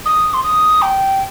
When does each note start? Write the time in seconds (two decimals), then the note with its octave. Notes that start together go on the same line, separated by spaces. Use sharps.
0.05 D#6
0.34 C6
0.44 D#6
0.82 G5